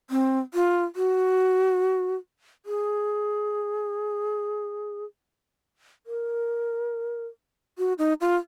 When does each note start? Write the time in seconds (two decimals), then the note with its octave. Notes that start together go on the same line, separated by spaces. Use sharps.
0.10 C4
0.54 F4
0.96 F#4
2.66 G#4
6.07 A#4
7.78 F#4
7.98 D#4
8.21 F4